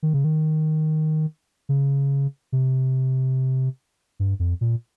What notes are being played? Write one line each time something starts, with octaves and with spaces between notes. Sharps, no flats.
D#3
C#3
D#3
C#3
C3
G2
F2
A#2